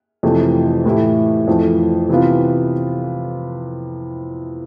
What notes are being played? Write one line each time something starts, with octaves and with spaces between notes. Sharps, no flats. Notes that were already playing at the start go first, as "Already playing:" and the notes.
F2 C3 E3 A3
A2 E3 A3 E4 G4
F2 E3 A3
C3 E3 B3 F4